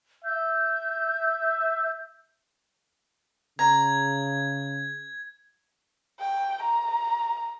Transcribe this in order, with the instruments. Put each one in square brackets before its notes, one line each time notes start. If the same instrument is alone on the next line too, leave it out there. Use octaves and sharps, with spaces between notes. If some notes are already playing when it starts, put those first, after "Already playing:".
[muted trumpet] E5 [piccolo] G6
[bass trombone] C#3 [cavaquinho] A#5 [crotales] G#6
[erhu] G5
A#5